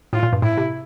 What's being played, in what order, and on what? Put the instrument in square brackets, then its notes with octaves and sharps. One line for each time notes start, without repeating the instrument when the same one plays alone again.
[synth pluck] A2 [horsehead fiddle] F4
[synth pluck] A#2
G2
[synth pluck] A2 [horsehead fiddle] E4
[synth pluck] C3